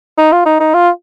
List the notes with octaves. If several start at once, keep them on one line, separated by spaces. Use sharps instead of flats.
D#4
F4
D#4
D#4
F4